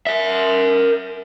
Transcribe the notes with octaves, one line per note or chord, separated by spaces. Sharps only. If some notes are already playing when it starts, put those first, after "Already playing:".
A#4 E5